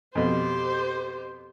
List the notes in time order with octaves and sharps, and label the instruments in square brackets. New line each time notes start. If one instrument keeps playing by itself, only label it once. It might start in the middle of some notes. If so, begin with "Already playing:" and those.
[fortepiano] F2 B2 [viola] G4 C5